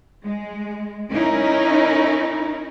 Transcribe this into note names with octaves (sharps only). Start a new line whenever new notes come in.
G#3
C#4 D#4 E4 A#4